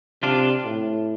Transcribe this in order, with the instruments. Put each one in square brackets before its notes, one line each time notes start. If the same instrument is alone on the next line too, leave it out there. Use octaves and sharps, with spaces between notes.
[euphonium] C3 [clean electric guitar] D4 F4
[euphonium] A2